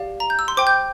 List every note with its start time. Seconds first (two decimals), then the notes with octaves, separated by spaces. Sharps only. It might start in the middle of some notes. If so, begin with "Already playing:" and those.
Already playing: G4 D5 F5
0.20 A#5
0.30 G6
0.39 E6
0.48 C6
0.57 C5 G5 D6
0.67 G6